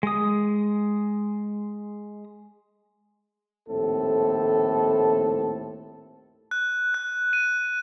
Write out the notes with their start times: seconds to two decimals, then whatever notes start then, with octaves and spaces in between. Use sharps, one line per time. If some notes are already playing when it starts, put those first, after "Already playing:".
0.03 G#3 D#6
3.68 A#1 D#2 A2 C4 A4
6.51 F#6
6.94 F#6
7.33 D#7